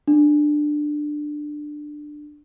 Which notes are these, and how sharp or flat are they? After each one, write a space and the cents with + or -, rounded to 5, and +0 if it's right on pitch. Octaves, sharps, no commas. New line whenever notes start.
D4 +15